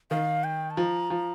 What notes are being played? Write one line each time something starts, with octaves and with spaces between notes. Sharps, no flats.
D#3 F5
G5
A5
F3 A#5
F3